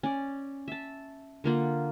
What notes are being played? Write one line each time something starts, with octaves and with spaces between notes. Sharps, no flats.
C#4 D5
E5 A5
D3 A#3 F4 F#5